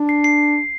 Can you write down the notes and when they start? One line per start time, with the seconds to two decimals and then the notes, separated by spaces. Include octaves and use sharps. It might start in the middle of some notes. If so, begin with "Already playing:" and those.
Already playing: D4
0.09 C7
0.24 C7